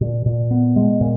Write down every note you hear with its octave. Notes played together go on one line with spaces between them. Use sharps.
A#2
A#2
B3
G#3
A#2